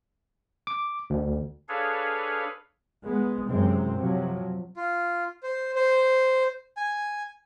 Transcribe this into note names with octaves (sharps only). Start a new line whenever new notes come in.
D6
D2
D4 G#4 A4 B4 C#5 F5
G#3 B3
F#2 C3 E3 G#3 C4
C3 F3 F#3
F4
C5
C5
G#5